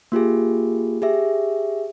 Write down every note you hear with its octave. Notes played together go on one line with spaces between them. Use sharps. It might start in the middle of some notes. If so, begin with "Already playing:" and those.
A#3 F4 G4 G#4
G4 G#4 E5